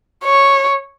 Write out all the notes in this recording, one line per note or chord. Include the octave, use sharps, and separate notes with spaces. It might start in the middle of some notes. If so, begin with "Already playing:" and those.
C#5